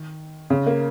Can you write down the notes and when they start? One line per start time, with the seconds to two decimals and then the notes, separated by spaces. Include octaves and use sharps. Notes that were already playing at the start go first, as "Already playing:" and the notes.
Already playing: D#3
0.50 C#3
0.67 A#3